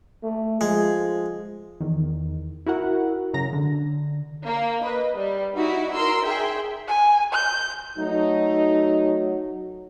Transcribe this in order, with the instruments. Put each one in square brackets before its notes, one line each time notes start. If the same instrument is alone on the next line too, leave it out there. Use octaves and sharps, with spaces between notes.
[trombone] A3
[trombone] F3 [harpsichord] G#3
[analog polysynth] E2 D#3
E4 F#4 A#4 F#5
F#2 C#3 A#5 A#6
D3
[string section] A#3
B4 D#5
G3
D#4 E4 F#4 E5
A#4 C6 E6
G#4 E5 G5 C6
[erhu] G#5
G6
[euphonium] F#3 [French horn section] A3 D#4